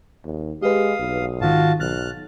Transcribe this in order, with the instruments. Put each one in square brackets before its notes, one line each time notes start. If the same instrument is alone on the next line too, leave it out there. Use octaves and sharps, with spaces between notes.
[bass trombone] D#2
[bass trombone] G#3 [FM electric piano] G4 B4 [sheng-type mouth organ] F5 D#6
[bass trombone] B1
[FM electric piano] G#2 D#3 [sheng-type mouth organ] F4 F#4 A5
[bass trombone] B1 [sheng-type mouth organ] F6 F#6 [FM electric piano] A6